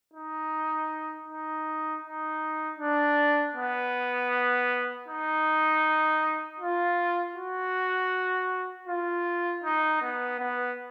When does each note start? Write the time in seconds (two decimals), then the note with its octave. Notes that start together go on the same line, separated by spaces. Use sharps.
0.14 D#4
1.28 D#4
2.04 D#4
2.79 D4
3.56 B3
5.08 D#4
6.60 F4
7.36 F#4
8.88 F4
9.64 D#4
10.02 B3
10.40 B3